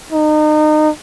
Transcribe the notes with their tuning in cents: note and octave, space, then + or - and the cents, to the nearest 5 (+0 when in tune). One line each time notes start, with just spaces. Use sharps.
D#4 -30